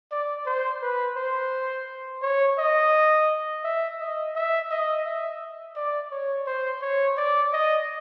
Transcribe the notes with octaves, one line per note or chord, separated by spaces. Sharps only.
D5
C5
B4
C5
C#5
D#5
E5
D#5
E5
D#5
E5
D5
C#5
C5
C#5
D5
D#5